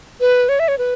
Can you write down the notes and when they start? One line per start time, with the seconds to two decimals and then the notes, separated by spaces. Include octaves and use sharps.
0.20 B4
0.49 C#5
0.60 E5
0.68 C#5
0.78 B4